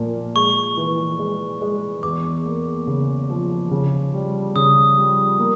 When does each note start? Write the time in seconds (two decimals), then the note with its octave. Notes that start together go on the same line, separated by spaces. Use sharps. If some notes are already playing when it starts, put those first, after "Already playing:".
Already playing: A#2 F3 A#3
0.36 G#3 C#6
0.77 E3
1.19 G#3
1.61 G#3
2.03 E2 D6
2.46 A#3
2.87 C#3
3.30 F3
3.71 C#3
4.14 G3
4.56 C#3 D#6
4.98 G3
5.39 A#3